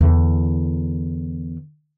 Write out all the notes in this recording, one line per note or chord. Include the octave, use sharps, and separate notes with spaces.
E2 D3